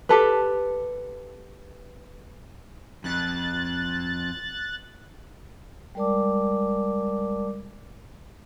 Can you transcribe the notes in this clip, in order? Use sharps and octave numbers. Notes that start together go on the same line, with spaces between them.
G4 A4 B4
F2 F#6 A6
G3 G#3 A#4 D5 A5 D6